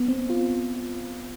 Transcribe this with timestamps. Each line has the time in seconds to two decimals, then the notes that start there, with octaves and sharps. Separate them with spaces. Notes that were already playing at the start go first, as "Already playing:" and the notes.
Already playing: B3
0.08 C4
0.30 F4